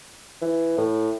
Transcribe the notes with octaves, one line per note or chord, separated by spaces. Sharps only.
E3
A2